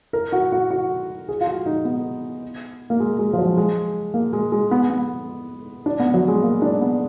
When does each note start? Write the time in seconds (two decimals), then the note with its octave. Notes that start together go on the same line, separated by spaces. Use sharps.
0.13 A#4
0.32 F#4
0.52 F#4
0.71 F#4
1.29 G#4
1.41 F4
1.47 F#4
1.66 D#4
1.85 B3
2.90 A#3
3.00 G#3
3.19 G#3
3.33 F3
3.38 F#3
3.57 G#3
4.14 A#3
4.33 G#3
4.52 G#3
4.71 B3
4.90 B3
5.86 D4
6.00 B3
6.14 F#3
6.28 G#3
6.43 A#3
6.62 D4
6.81 B3